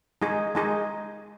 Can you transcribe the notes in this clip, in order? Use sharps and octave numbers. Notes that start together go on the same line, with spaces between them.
G#3 D#4 G#4
G#3 D#4 G#4